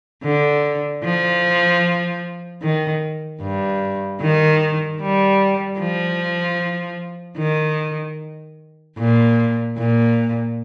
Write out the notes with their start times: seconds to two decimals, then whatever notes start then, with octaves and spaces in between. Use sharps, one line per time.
0.23 D3
1.04 F3
2.62 D#3
3.42 G2
4.21 D#3
5.01 G3
5.80 F3
7.39 D#3
8.98 A#2
9.77 A#2